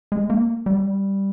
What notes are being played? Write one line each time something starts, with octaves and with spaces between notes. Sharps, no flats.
G#3
A#3
G3